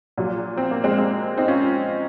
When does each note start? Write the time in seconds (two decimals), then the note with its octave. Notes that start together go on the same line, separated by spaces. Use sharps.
0.17 A#1 A#2 F#3
0.57 C4
0.71 A#3
0.84 G#3 C4
0.98 G#3 C4
1.38 C4 D#4
1.48 C#4 F4